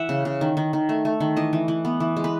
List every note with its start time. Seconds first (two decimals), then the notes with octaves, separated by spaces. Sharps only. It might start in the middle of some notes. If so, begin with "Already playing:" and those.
Already playing: E3 E5 F#5
0.09 C#3
0.25 C#3
0.41 D#3
0.57 D#3
0.73 D#3
0.89 A3
1.05 A3
1.20 D#3
1.37 E3 D#5
1.53 E3
1.68 E3
1.85 B3
2.00 E3
2.16 G#3
2.24 B4